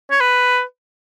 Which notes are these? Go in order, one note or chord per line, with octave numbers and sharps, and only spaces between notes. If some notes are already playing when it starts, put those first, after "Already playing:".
C#5
B4